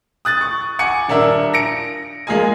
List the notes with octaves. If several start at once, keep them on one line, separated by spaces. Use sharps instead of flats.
D#6 F#6 A6
C#6
F#5 G#5 D6 C#7
D#1 D4 A#4 E5
A#6 C#7 D7
G#3 A#3 F4 D#5 G#5